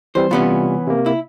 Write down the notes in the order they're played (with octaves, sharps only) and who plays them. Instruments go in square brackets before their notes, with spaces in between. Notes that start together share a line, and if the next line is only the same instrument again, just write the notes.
[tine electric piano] E3 G3 C4 [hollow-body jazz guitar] C5
[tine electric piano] C3 G3 F4 [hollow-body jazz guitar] E3 B3 C#4
[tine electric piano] C3 A#3
[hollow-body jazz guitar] E4